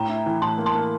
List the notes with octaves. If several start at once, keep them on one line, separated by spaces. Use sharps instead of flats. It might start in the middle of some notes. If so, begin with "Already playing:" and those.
Already playing: A2 G5 A#5
E4
E3
A2 A5 C6
A#3
A5 C6
A#3